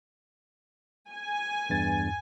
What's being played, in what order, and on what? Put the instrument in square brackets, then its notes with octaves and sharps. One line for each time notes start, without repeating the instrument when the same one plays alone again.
[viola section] G#5
[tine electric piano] E2 G2 A6